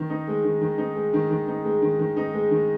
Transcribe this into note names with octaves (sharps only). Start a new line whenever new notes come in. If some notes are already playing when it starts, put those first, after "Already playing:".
Already playing: D#3
D#4
G#3
D#3
D#3
D#4
G#3
D#3
D#3
D#4
G#3
D#3
D#3
D#4
G#3
D#3